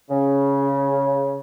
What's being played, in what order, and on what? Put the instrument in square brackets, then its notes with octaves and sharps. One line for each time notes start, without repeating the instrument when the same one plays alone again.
[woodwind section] C#3